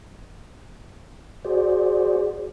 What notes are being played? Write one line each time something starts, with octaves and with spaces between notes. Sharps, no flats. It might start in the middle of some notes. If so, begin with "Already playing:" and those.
F#4 G#4 C5 D5